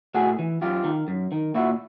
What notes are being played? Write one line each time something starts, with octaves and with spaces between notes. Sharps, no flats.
A2 F#4 G#4
E3
F#2 F4 G4
D#3
F#2
D#3
A#2 E4 F#4